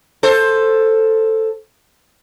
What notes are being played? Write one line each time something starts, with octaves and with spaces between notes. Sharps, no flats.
A4 C5